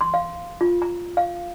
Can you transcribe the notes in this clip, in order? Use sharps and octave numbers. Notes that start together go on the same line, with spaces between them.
C6
F5
F4
A#5
F5